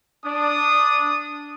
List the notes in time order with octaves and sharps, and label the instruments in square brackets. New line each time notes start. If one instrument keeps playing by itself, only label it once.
[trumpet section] D4 [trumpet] D#6